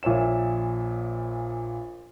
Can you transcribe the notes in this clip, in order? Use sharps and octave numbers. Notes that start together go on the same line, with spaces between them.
A#1 A#2 C#5 E5 E7